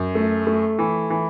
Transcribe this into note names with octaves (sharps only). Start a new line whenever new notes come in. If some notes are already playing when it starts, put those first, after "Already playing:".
Already playing: F#2
A3
A3
E3
E3